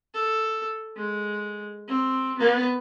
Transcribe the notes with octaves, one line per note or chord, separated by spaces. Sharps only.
A4
G#3
C4
B3